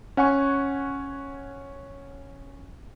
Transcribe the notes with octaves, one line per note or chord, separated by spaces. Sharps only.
C#4 F#5 G#5 C#6